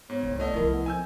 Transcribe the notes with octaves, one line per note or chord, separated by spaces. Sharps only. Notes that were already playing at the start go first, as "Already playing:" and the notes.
G#2 B3 C#5
C2
A3 B3 D5 D#5
C2 F3 E4 A#4
B3
C4 G#5 E6 G6